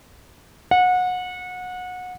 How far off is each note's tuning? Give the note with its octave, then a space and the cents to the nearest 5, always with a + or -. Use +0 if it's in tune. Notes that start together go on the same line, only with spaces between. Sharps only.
F#5 -25